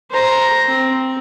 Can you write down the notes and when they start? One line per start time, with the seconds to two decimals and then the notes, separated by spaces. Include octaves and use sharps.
0.11 C5 A#5
0.67 C4